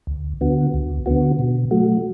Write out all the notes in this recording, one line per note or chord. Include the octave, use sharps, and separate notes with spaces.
D2
D3 B3 F#4
D2
D3 B3 F#4
B2
F#3 A3 F#4